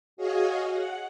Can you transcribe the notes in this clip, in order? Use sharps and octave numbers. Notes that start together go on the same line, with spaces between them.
F#4 G#4 C#5 D#5 F5
F#5